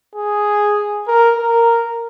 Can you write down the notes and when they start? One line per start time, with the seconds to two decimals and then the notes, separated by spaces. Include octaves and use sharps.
0.16 G#4
1.08 A#4
1.38 A#4